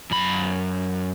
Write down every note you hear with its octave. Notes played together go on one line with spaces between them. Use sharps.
F#2 B5